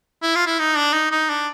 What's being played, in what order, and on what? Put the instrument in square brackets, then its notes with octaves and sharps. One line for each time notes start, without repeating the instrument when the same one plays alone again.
[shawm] E4
F4
E4
D#4
D4
D#4
D#4
D4